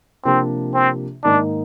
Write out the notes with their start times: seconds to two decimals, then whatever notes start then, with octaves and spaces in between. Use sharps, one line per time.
0.25 C3 F3 A#3 C4 D4 G4
0.74 C4
1.24 G#2 D#3 A#3 D4 D#4